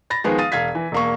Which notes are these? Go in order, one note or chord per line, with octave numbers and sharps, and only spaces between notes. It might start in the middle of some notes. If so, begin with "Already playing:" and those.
B5 A6 A#6
D#3 F3 G#3 B3 B4
F5 D#6 A6 D#7
E1 F5 G#6 B6
E3
E1 A#3 C#6